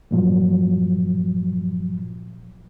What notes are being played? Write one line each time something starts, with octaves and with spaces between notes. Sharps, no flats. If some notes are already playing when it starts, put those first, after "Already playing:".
G2 A#2 F3 F#3